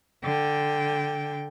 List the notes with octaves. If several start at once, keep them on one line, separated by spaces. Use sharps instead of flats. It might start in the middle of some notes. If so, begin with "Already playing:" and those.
D3 G5